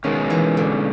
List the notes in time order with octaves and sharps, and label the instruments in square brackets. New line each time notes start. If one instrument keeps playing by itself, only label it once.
[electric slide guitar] B2 G#3 C#4 [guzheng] D#3
[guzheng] E3
D3